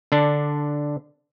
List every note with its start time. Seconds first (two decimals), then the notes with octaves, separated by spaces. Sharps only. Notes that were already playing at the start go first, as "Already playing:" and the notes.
0.12 D3 D4